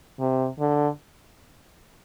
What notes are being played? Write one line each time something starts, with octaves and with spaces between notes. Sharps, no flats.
C3
D3